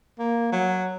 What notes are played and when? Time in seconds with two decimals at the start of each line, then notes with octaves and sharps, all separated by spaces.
0.19 A#3
0.52 F#3